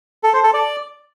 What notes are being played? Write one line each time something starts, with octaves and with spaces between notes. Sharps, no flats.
A4
C5
A4
D5